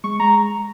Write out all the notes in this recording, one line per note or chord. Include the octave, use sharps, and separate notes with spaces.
G#3 C#6
G#3 A#5